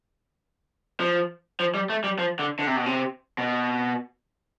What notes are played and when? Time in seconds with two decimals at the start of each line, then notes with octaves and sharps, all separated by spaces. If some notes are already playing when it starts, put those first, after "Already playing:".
1.00 F3
1.60 F3
1.75 G3
1.90 A3
2.04 G3
2.19 F3
2.39 D3
2.59 D3
2.67 C3
2.76 B2
2.86 C3
3.38 B2